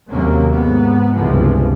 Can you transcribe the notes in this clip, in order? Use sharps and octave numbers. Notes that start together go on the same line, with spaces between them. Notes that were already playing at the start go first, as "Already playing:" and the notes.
D#2 C3 F#3 A#3 C#4
G#2 B3
G1 C#2 C3 E3 F3